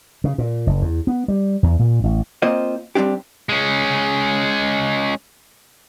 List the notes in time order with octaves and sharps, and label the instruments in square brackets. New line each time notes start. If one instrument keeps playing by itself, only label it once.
[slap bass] C#3
A#2
F#1
E2
B3
G3
E2
A#2
A1
[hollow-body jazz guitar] A#3 C4 F4 C5 D#5
G3 G#3 C4 D4 G4
[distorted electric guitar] G#3 C#4